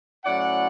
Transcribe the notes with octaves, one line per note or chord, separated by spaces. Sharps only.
A2 F#3 C#4 E4 D5 F#5